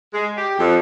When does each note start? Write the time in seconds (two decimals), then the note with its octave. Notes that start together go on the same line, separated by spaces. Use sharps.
0.13 G#3
0.36 G4
0.58 F2